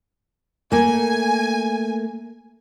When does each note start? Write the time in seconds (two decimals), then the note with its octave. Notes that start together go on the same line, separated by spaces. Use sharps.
0.72 A3 A#3 G#5